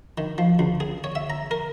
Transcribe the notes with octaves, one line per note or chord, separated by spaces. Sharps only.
D#3
F3
C#2
G#4
C#5
E5
A#5
A#4